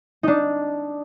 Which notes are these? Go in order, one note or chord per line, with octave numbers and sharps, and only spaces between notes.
D4 D#4